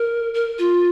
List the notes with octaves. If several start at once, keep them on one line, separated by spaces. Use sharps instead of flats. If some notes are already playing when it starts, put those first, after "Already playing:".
Already playing: A#4
A#4
F4